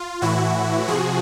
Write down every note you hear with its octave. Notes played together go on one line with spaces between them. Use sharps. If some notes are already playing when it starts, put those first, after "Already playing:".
Already playing: F4
A2 E3 E4 F#4
C3 F3 F#4 G#4